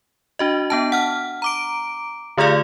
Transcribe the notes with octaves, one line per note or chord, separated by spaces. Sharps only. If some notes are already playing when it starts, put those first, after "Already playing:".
D4 F#4 D#5
B3 D4 A5
F#5 F6
A#5 D6 D7
D3 A3 F4 G#4 D5 F5